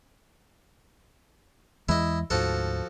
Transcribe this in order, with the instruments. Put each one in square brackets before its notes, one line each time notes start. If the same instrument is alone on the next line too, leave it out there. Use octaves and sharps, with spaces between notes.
[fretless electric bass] E2 E3 G#3 [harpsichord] E4 D#5
[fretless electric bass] D2 G#2 [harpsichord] F3 F#4 A4